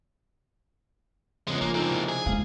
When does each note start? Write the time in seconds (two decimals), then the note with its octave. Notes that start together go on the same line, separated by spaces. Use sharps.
1.48 C#3 F3 G#3 B3 C#4
1.61 D#3 F3 A#3 D4
1.75 G#3 A#3 C4 D#4 A4
1.91 C3 E4
2.09 G#4
2.26 F3 G#3 F5